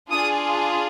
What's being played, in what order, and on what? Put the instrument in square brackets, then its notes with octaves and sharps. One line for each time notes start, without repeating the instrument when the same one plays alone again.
[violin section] D4 F4 G#4 D#6